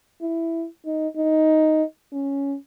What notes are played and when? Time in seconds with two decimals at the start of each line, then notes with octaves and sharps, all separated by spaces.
0.22 E4
0.86 D#4
1.17 D#4
2.12 C#4